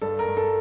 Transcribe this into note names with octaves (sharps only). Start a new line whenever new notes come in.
G2 A4
A#4
G2
A4